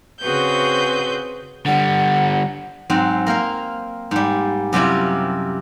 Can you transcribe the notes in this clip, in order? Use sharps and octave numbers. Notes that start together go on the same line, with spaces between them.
C#3 C4 F#4 G#4 B4 G6
D3 G3 F#5
G#2 F#3 C4
A#3 A#4 C5 F5
G#2 G3
F#2 C3 G3 E4 F4